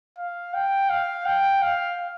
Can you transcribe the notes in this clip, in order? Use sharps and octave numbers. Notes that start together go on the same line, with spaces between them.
F5
G5
F5
G5
F5